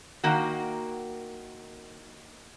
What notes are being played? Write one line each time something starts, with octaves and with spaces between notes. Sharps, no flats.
D#3 A#3 F#4